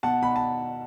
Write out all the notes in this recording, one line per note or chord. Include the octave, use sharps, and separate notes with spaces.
B2 F#5 A5
B2 B5
A5